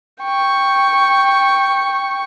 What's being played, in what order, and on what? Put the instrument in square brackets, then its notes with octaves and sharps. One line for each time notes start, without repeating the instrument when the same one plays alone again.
[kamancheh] G5 C#6